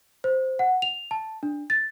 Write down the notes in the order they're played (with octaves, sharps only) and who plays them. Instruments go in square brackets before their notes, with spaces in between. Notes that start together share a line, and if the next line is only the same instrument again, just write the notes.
[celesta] C5
F#5
F7
A5
D4
A6